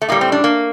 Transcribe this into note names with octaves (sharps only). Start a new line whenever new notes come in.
A3
A2 G3 A#3
C4
D4
A#3